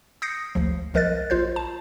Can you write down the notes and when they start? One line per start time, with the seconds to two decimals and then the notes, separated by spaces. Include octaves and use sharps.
0.22 D#6 G6 A#6 C7 C#7
0.55 G#1 D2 F3
0.94 C2 F3 A#4 D#5 F#6 A6
1.30 A#1 F4 C5 G6
1.56 A5